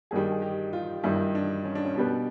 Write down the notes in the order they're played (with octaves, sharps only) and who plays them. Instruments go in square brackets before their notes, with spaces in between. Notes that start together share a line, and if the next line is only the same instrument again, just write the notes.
[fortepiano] G2 D#3 G3 [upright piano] G#4
[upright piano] G#4
G4
F4
[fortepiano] G2 D#3 G3 [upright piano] E4
[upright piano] D4
C#4
D4
C#4
[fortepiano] B2 G3 B3 [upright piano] D4